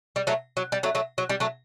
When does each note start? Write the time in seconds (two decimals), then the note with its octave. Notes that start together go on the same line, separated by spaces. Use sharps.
0.16 G3
0.27 F#3 A3
0.57 F#3
0.72 G3
0.83 F#3 A3
0.95 F#3 A3
1.18 F#3
1.29 G3
1.40 F#3 A3